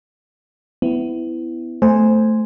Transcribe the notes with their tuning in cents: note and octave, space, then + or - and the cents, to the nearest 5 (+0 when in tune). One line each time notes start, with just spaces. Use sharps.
B3 +30 E4 +0
A3 +0 C5 +0 G#5 -5